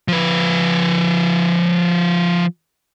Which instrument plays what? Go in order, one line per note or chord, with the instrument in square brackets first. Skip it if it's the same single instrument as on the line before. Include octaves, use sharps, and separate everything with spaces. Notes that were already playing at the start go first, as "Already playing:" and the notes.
[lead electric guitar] F3 B4